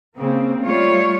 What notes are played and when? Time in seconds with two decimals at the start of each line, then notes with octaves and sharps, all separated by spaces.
0.16 C#3 A#3 C4
0.62 G3 A3 F4 C#5